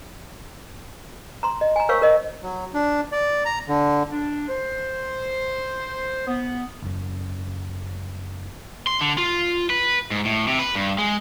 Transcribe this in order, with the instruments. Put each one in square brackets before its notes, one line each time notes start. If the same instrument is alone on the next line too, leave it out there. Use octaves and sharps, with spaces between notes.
[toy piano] A#5 C6
D#5
G#5 A#5
A#4 C5 C#5 F5 C#6 E6
A#4 D#5
[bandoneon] F#3
D4
D5
A#5
D3
[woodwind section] D4
C5
B3
[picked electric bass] F#1 F#2
[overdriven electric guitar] C6
D3
F4
B4
G#2
A2
C3
B4
G2
G#3